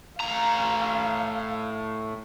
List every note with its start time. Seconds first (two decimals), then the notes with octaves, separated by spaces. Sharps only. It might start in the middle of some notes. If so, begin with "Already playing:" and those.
0.21 A2 F5 A#5